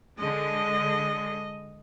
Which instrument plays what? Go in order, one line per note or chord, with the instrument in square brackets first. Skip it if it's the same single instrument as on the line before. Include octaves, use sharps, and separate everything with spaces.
[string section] D3 G#3 [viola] D#5